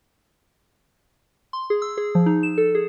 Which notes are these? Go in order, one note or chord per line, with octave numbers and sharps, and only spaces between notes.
C6
G#4
E6
G#4
F3
D#4
E7
A4
G#4